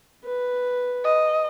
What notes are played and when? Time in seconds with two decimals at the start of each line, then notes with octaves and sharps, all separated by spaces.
0.25 B4
1.04 D#5